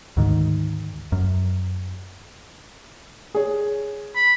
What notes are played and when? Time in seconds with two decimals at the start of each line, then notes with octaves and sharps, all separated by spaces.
0.17 D2 G#2 D#3
1.12 F#2
3.35 G#4 C#5
4.15 B5